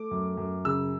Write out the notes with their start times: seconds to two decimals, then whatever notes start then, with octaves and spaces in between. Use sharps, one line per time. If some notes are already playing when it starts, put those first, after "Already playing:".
Already playing: A3 D6
0.11 F#2
0.37 F#2
0.65 C#3 E6